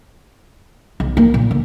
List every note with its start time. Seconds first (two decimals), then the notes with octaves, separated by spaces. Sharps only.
1.00 B1
1.17 A#3
1.34 A#2
1.51 D3